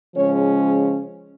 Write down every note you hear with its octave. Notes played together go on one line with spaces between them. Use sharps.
C#3 F3 G#3 C#4 C#5